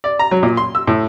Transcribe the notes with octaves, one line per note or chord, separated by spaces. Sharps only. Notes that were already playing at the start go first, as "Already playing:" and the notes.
D5
A#5
F#3
A#2
C6
E6
A2